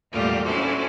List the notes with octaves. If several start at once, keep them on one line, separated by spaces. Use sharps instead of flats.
E2 A#2 G3 A3 F4 G4
C#4 D4 E4 F#4 A4 C5